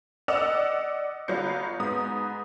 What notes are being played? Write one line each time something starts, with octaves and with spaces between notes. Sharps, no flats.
D5 D#5 F#5 E6 E7 F7
G1 F#3 F4 G6 C#7
G#2 B3 D#6